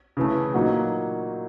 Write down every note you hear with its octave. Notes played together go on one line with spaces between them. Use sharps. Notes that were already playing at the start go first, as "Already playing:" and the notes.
C#3 E3 A3
A#2 F#3 A#3 D#4 F#4